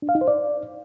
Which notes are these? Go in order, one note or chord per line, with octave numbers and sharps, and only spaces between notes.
D4
F5
D#4
C5
D5